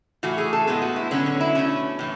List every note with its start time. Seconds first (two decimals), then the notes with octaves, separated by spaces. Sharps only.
0.23 A2 E3 A3 F#4
0.38 G#4
0.53 A4
0.67 A2 G#3 B3 G#4
0.82 F#4
0.96 E4
1.11 D3 F#3 B3 C#4
1.26 C#4
1.41 E4
1.55 B2 A3 C#4
1.99 A2 E3